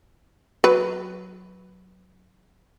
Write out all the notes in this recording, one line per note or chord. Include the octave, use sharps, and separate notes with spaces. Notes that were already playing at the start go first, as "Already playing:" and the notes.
F#3 B4